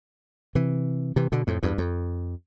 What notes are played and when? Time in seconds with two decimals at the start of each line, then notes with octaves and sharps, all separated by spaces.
0.55 C3 E3
1.16 C3 E3
1.32 B2 D3
1.47 F2 A2
1.63 E2 G2
1.78 F2